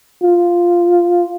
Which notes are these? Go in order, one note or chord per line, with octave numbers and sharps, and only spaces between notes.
F4